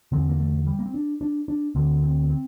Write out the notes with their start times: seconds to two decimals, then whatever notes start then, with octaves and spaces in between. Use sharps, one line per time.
0.12 E2 D3 C4
0.29 A#3
0.40 A3
0.66 G3
0.79 A#3
0.86 C4
0.94 D4
1.21 D4
1.48 D4
1.75 D2 D3 C4
2.02 C4
2.30 C4